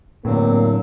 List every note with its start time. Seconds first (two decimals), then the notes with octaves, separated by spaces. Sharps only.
0.25 E2 A2 D3 F#3 A#3 C4